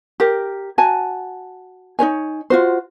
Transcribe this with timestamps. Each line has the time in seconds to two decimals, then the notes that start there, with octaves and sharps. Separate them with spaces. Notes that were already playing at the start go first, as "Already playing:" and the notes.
0.20 G4 A#4
0.78 F#4 G#5 A5
1.99 D#4 B4 C#5 G#5
2.50 F4 F#4 C5